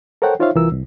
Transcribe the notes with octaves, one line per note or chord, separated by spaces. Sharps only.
A4 A#4 C5 C#5 F#5 G5
D#4 F4 C5 C#5 E5 F5
C2 E3 F4 A#4 E6
C2